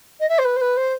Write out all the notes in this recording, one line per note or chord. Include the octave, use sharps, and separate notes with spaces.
D#5
E5
C5
B4
C5
B4
C5